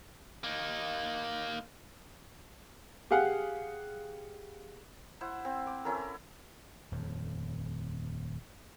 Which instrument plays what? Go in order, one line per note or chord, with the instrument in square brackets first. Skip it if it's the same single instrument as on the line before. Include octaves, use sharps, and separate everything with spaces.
[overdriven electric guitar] A#3 D#4
[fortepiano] G4 G#4 F5 F#5
[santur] E4 C5 F#5
C4
D6
C#4 E4 A4 A#4
[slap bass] D#1 F2